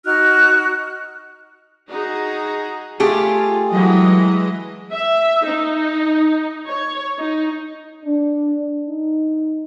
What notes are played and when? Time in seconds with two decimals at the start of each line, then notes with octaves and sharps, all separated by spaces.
0.04 D#4 F#4 F6 F#6
1.89 D#4 F#4 G#4
3.00 A3 F4 G4 G#4
3.72 E3 F#3 G#3 D#5
4.93 E5
5.46 D#4
6.68 C#5
7.19 D#4
8.04 D4
8.88 D#4